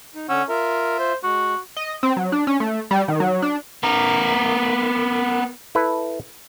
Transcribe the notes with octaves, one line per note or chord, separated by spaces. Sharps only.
D#4
D3 C#4 F#5 E6
F4 A#4 E5
C5
G#3 F#4
D#5
C4
F#3
D4
C#4
A3
G3
D#3
F#3
D4
B3 A#4
E4 A4 B4